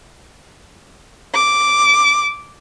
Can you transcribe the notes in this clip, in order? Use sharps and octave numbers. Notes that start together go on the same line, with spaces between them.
D6